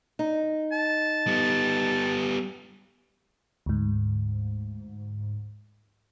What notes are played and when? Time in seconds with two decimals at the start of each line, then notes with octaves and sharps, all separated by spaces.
0.19 D#4
0.72 A5
1.26 G3 B3
3.66 D2 G#2